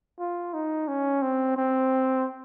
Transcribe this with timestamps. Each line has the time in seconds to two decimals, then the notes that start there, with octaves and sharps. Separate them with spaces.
0.19 F4
0.53 D#4
0.88 C#4
1.22 C4
1.56 C4